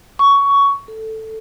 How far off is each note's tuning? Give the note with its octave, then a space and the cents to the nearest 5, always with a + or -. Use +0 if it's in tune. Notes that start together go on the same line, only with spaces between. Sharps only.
C#6 +15
A4 +5